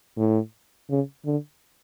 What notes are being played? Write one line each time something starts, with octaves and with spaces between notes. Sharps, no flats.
A2
C#3
D3